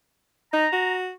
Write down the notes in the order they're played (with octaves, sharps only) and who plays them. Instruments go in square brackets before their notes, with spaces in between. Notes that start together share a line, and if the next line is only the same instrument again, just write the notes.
[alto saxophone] D#4 [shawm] A#5
[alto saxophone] F#4